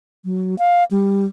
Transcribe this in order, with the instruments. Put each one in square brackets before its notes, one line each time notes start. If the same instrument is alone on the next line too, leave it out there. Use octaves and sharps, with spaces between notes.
[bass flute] F#3
F5
G3